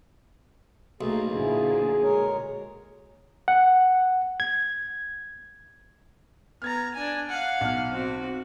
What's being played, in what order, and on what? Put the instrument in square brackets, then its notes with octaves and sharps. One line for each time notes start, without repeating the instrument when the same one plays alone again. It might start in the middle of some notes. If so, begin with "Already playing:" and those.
[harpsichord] B1 [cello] A3 A#3 [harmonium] G#4
[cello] A#2 D3 [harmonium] F3 E4 [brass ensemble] G#4
[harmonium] G#3 A#4 C#5
[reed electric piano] F#5
G#6
[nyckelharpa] B3 A#5 [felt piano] F6 G#6 A6
[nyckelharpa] D4 G#5
F5 F#5
[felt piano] B1 F6
[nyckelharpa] C4 F#4